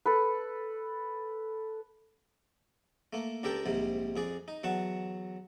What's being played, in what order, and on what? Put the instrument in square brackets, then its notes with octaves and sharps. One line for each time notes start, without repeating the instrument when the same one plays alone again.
[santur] A4 B4
[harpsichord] A3 A#3
C#2 D4 G4 A4 A#4 G5
A#1 G#2 C3 G3
F2 G#4 D5
D#4
E2 F#3 F#5 A5 C#6